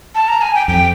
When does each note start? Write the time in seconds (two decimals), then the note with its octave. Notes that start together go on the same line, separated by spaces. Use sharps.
0.15 A5
0.28 A#5
0.41 G#5
0.55 G5
0.68 F2 G5